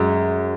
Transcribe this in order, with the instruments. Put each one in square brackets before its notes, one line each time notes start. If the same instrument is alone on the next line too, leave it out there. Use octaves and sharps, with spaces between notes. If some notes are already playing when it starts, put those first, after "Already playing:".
Already playing: [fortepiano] F#2 G#3